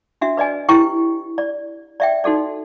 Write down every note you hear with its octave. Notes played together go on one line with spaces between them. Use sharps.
D4 F#4 E5
B4 D5 D#5 G#5
E4 G4 B4 G5 C#6
D5
D5 E5 G5
D#4 F#4 A4 D5